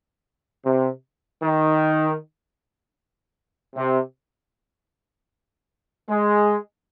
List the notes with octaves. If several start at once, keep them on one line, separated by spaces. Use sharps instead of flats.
C3
D#3
C3
G#3